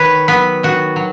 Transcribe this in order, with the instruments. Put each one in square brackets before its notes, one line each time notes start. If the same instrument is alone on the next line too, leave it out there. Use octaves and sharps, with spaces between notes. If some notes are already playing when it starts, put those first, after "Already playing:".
Already playing: [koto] D#3 B4 C#5
F#3 B3 B4
D#3 F#4
F#3